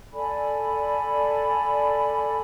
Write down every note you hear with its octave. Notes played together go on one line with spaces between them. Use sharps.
A4 D5 G#5 B5